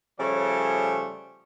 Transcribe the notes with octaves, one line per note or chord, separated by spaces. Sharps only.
C#3 F3 G3 A3 C#5